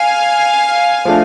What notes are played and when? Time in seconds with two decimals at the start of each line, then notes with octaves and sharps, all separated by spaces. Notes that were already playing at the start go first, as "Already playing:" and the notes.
Already playing: F5 G#5
1.05 F3 A3 D4